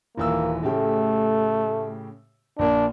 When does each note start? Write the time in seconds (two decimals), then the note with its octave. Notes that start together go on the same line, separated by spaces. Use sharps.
0.18 D#1 E3 A#3 E6
0.63 A2 C#3 A3 G4
2.59 A#1 A#3 D4